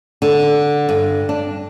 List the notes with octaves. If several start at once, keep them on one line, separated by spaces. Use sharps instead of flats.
D3
G2
D4